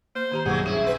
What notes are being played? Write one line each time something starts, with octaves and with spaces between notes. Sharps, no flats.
A#3 C5
D#3 G4 A#5
B1 G2 D#3 F#3 G3 A#3 G#4 F#5
C#4 E4 G#4
C4 B4